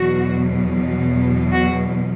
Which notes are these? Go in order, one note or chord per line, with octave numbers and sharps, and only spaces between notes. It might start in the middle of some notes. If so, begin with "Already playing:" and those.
Already playing: E2 B2 F#3 F#4
F#4